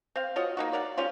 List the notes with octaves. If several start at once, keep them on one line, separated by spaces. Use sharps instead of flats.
C4 F5
F4 F#4 C#5 D#5
A#3 D#4 F#4
F#3 A#4 D5
G3 G#3 C#4 F4